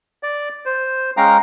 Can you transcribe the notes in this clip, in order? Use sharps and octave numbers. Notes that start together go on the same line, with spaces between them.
D5
C5
G#3 C#4 F5 G5 A#5